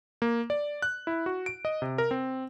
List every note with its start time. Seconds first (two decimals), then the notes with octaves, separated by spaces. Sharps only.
0.22 A#3
0.50 D5
0.82 F#6
1.07 E4
1.26 F#4
1.46 D7
1.65 D#5
1.82 C3
1.98 A#4
2.11 C4